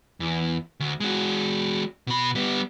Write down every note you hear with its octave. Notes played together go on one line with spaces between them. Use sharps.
E2
D2
G#3 F#4
B2 B5
G3 B3